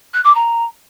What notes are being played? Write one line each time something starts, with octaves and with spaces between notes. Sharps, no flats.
F#6
D6
A#5